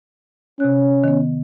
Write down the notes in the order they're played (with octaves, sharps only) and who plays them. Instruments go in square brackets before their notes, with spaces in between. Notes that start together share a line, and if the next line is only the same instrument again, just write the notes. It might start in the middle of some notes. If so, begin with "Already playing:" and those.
[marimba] C3 F#6 [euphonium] C#4
[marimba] D#3 B3